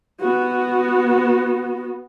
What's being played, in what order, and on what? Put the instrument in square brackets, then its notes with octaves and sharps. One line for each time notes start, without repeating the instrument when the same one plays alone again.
[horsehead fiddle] B3 F#4